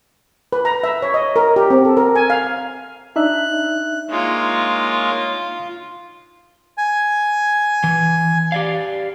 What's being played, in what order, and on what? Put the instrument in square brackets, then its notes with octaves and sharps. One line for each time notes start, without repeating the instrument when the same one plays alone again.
[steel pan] B4
A#5
E5
C#5
D#5
A#4
G4
C4
A4
A#4
G#5
F5
[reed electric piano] D4 D#4 E5 [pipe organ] F#6
[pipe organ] G#3 A#3 C#5 [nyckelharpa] F4
[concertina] G#5
[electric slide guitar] E3
G4 D5 F5